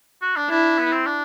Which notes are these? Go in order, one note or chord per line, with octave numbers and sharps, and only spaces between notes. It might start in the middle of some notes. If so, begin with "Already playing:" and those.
F#4
D4
D4 E4
B3
C4
D4